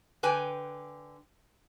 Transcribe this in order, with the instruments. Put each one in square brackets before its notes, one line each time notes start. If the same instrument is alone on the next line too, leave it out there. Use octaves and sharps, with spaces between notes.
[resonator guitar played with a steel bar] D3 B4 G5 G#5